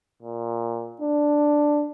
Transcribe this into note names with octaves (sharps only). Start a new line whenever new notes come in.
A#2
D4